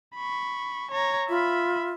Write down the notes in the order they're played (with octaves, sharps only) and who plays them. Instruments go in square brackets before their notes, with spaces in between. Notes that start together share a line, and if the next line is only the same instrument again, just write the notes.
[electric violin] B5 C#6
C#5 A#5
[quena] F4 [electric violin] E5 B5